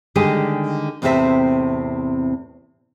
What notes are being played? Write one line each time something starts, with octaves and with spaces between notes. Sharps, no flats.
D3 D#3 G3 G#3 G4 G#4
E2 A2 C3 D#3 C4 E5